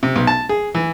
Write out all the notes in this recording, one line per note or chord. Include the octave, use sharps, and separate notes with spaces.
C3
B1
A5
G#4
E3